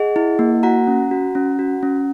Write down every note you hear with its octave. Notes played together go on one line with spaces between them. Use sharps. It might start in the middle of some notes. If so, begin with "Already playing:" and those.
Already playing: G#4 D#5 F#5
E4
A#3
F#4 F#5 A#5
C#4
F#4
C#4
F#4
C#4